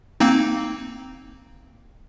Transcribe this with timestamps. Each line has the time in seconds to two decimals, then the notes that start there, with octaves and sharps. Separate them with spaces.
0.20 A#3 C4 D#4